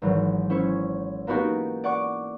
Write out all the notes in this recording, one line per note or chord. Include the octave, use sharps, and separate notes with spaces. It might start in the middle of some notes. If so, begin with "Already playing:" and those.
G#1 E3 F#3
C#4 E4 C5 C#5
A#3 B3 D#4 F#4 G4 B4
D5 F#5 C#6 D6